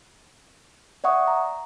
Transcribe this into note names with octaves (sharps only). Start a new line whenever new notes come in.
D5 E5 F#5 C#6 D#6
A#5